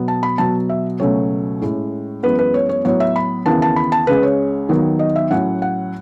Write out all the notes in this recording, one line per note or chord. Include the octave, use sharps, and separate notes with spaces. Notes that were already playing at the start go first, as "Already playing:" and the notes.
Already playing: B2 F#3 B3
A5
B5
B2 F#3 B3 A5
E5
C#2 B2 F#3 A3 C#4 C#5
A2 G#3 C#4
F#2 E3 G#3 B3 B4
B4
C#5
C#5
A2 F#3 B3 C#5
E5
B5
D#2 C#3 E3 B3 A5
A5
B5
A5
C#2 C#3 G#3 B4
C#5
D#2 D#3 F#3 B3
D#5
E5
A2 F#3 C#4 F#5
F#5